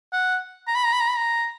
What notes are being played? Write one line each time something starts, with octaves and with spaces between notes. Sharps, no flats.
F#5
A#5
B5
A#5
B5
A#5
B5
A#5